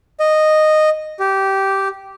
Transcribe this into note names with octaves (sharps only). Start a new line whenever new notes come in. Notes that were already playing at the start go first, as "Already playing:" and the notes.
D#5
G4